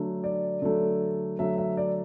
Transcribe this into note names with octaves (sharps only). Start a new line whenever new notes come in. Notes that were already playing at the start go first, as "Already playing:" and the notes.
Already playing: D3 F#3 A3
D5
D3 F#3 A3
D3 F#3 A3 E5
E5
D5